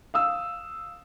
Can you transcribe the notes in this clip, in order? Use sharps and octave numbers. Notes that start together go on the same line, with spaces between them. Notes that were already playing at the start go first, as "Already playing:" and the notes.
F5 D#6 E6